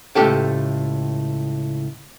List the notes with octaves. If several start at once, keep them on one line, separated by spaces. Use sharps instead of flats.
C#2 A2 A3 G4 A4 G5